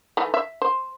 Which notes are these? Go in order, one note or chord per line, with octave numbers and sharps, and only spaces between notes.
E3 A3 D#4
E5
C5